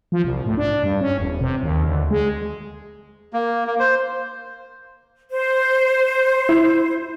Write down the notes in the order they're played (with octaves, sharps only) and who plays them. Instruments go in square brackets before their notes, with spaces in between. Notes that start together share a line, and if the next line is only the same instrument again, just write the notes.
[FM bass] F3
C2
A2
D4
G2
C#4
E1
C3
D#2
D2
G#3
[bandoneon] A#3
A#3
C5
[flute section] C5
[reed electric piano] E4